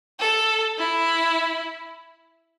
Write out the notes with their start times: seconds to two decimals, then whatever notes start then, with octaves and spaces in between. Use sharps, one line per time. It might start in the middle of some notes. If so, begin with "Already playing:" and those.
0.20 A4
0.79 E4